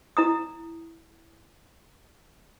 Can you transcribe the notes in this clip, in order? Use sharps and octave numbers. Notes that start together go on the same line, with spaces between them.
E4 A#5 D#6